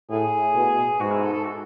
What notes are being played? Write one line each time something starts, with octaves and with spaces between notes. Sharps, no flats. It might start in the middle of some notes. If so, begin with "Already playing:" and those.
A2 G#4
B2
G#2 F#4
E4
A4
A4
F#4